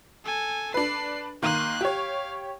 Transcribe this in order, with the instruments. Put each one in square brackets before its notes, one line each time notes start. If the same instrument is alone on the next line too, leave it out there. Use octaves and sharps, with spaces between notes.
[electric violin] A4 G#5
[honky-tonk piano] D4 B4 [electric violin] C7
[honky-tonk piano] D#3 A#3 D#7 [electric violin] C6 F#6
[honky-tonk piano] G4 C#5 [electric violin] F5